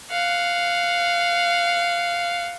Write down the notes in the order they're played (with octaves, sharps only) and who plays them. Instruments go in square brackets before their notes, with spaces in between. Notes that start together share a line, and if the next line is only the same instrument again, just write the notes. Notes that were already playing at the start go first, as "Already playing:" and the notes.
[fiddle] F5 F#5